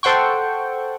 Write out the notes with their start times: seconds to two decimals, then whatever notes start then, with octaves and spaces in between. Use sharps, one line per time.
0.03 A4 C5 F#5 G5 C#6